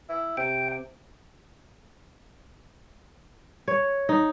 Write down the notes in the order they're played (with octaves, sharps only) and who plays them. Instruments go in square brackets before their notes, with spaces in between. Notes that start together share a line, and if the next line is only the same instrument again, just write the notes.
[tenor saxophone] E4
[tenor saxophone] C3 [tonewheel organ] G5
[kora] C#5
D#4